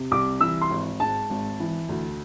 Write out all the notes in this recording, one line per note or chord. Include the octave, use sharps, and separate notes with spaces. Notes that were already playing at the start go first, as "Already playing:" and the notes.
Already playing: C3
C2 D6
E3 E6
C6
G#1
G#2 A5
G#1
E3
D2